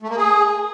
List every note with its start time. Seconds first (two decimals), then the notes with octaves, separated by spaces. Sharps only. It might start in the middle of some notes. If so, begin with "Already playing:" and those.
0.02 A3
0.10 A#3
0.17 G#4